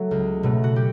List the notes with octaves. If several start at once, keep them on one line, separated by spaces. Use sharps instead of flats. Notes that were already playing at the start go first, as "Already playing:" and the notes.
Already playing: F#3 A3 A4
C#2
B2 F#3 A3
F#4
G4